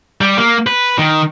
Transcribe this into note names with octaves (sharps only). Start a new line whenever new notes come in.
G3
A#3
B4
D#3